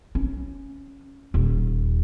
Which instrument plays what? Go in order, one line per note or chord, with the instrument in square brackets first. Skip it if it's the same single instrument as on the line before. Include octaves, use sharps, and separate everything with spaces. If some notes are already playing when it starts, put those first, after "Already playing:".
[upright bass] C#4
D#1 D#2